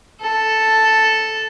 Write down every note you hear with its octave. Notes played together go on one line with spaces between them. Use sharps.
A4